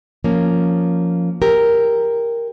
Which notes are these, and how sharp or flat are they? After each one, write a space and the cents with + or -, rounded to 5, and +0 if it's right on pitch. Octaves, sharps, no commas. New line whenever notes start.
F3 +0 A#3 -10 C#4 +0
G4 +15 A#4 +0